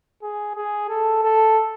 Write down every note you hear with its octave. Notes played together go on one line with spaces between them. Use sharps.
G#4
G#4
A4
A4